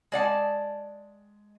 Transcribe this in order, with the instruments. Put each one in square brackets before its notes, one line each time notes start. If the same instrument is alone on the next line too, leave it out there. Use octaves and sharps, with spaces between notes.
[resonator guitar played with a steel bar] G#3 D5 F#5 A5